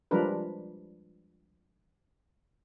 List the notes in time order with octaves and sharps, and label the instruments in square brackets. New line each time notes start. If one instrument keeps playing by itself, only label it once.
[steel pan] F3 G3 G#3 D4 A#4 B4